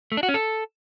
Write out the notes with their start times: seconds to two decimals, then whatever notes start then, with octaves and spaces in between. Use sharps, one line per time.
0.12 A3
0.17 D4
0.23 F#4
0.29 C#4
0.34 A4